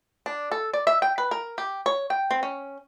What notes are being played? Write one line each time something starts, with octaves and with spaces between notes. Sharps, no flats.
D4
A4
D5
E5
G5
B4
A#4
G4
C#5
G5
C4
C#4